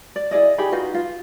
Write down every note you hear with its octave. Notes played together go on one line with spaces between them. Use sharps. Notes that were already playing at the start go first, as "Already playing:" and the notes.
D5
E4 G#4 D5 D#5
D#4 G4 G#4 B5
D#4 F4 F#4 B4
F4